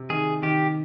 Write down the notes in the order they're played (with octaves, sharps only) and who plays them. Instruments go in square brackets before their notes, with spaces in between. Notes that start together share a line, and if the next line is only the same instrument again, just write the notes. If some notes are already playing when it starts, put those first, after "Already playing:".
Already playing: [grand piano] C3
[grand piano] D#3 [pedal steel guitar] G#4
[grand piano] D#3 [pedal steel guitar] G4